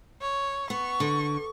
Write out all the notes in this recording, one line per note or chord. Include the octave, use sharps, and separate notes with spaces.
C#5
B3 C#6
D3